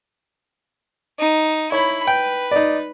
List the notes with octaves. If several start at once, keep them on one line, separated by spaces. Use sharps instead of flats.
D#4
E4 C#5 B5
B4 G5
D#4 D5